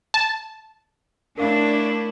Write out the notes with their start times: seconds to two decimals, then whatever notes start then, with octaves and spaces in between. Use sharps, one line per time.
0.14 A5
1.38 A3 C#4 D4 E4 A#4 F5